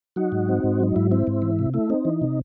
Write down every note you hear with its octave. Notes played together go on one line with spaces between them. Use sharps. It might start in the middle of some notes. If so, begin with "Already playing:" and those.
F#3 D#4 F#4
G#2
C4
G#2
F#3 D#4
G#2 E4
C4 E4
G#2
E3
C3
A3 E4
C4 D#4
E3
C3